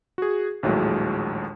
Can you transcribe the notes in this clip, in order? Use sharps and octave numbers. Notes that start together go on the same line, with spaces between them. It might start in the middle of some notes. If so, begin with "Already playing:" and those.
F#4 G#4
A#1 D#2 A2 F#3 G#3